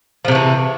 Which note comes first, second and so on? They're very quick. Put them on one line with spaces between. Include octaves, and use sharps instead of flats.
F3 C3 A3 E3